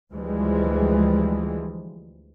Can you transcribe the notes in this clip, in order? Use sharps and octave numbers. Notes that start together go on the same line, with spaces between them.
D2 E3 F3 G3 G#3